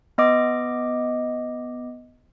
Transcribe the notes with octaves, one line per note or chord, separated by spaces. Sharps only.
B3 D#5 D6